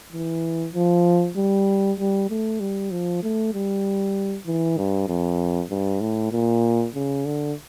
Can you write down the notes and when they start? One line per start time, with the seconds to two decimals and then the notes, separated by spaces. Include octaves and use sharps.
0.12 E3
0.74 F3
1.37 G3
1.99 G3
2.30 A3
2.60 G3
2.91 F3
3.23 A3
3.54 G3
4.46 E3
4.77 G2
5.08 F2
5.70 G2
6.01 A2
6.32 A#2
6.94 C#3
7.25 D3